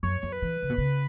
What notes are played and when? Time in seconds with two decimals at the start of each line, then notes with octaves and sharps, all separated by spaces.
0.03 F#2 C#5
0.21 F#2 C#5
0.32 B4
0.42 E3
0.62 C#3
0.70 B2
0.78 C#3